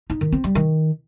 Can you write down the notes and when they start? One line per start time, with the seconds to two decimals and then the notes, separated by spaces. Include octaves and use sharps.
0.10 D#4
0.21 D#3
0.32 C4
0.44 G3
0.55 D#3